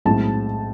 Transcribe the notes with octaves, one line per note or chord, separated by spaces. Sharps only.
B1 A2 G#3 C4 A5